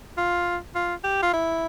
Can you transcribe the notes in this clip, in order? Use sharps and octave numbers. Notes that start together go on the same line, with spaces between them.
F4
F4
G4
F4
E4